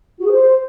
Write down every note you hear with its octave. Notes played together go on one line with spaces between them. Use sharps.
F#4
G#4
C5